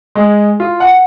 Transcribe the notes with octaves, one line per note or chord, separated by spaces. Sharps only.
G#3
F4
F#5